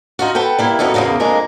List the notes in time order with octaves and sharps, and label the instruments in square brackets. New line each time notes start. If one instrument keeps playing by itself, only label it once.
[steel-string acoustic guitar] D#4 F4 F#4
A4 B4 F#5 G5
G3 A#3 E4
F#2 A#2 B3 D#4 A4
E2 G#2 C#3 A#3 B3
F2 G#3 A#3 D4 G#4 A#5